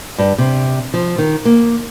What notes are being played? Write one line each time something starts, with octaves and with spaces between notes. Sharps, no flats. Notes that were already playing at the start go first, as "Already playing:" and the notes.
G2
C3
F3
D#3
A#3